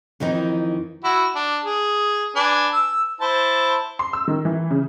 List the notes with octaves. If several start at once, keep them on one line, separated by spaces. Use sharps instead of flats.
F2 D#3 E3 D#4
E4 F#4
D4
G#4
D4 B4 G#5
E6
E4 C5 A5
C6
E6
D#3
E3
C#3